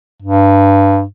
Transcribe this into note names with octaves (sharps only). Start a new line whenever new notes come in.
G2